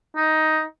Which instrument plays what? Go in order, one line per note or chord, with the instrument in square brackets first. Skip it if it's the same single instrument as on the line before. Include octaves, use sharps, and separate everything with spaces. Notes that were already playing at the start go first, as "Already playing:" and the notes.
[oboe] D#4